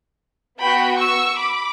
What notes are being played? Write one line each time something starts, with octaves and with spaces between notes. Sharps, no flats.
B3 F#4 G5 B5
C#6 E6
B5 D6